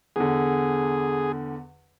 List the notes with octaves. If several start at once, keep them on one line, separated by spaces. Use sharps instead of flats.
E2 D3 G#4